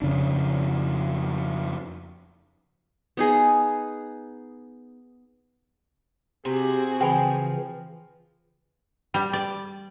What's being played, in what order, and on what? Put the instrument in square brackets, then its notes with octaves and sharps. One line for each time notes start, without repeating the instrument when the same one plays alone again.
[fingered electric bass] F2 C#3 D4
[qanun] B3 D#4 G#4
[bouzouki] C3 [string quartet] C4 F#4 G#4
[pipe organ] C#3 E3 [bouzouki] F3 [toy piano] G5 G#5 B5
[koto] G3
D5